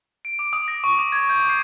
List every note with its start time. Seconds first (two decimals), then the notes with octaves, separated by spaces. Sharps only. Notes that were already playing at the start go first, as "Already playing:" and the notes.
0.25 D7
0.39 D6
0.53 D#6
0.68 A#6
0.84 C#6
0.99 D6
1.12 G#6
1.29 G6
1.49 C7